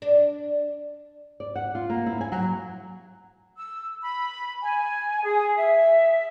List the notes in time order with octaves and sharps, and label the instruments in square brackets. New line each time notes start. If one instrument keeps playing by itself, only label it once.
[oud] D4
[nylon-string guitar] D5
F#5
F4
A#3
E4
G#5
F#3
[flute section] E6
B5
G#5
G#4
E5